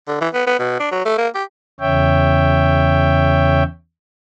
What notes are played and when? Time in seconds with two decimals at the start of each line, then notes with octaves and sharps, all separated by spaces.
0.08 D3
0.21 E3
0.34 B3
0.47 B3
0.59 B2
0.80 D4
0.91 F#3
1.05 A3
1.18 A#3
1.35 G4
1.80 E2 C#3 C#5 E5 G5